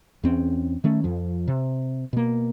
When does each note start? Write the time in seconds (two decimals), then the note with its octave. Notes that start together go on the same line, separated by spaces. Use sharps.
0.24 E2 C4 C#4
0.84 D#3 A3 C#4
1.04 F2 F3
1.48 C3
2.13 B2 A#3